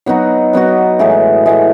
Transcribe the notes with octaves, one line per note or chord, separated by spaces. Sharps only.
F#3 B3 D#4 F#4
F#3 B3 D#4 F#4
A2 E3 G#3
A2 E3 G#3